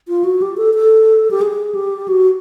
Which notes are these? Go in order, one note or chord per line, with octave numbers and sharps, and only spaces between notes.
F4
F#4
G4
A4
A4
G4
G#4
G4
F#4